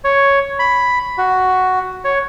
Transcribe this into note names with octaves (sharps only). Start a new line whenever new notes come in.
C#5
B5
F#4
C#5